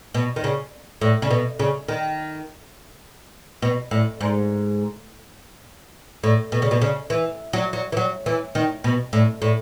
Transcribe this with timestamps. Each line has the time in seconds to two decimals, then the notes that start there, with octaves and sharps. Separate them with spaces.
0.14 B2
0.36 D#3
0.44 C#3
1.01 A2
1.22 C#3
1.30 B2
1.59 C#3
1.88 D#3
3.62 B2
3.91 A2
4.21 G#2
6.23 A2
6.52 B2
6.62 C#3
6.71 B2
6.82 C#3
7.10 E3
7.53 F#3
7.73 F#3
7.92 E3
7.97 F#3
8.26 E3
8.55 D#3
8.84 B2
9.13 A2
9.42 A2